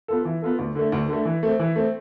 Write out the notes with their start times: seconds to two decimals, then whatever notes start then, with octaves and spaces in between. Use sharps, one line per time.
0.08 B3 F4 A4
0.25 E3
0.42 B3 F4 A4
0.59 D2
0.75 D3 A3
0.92 D2
1.08 D3 A3
1.25 E3
1.43 A3 C4
1.59 E3
1.76 A3 C4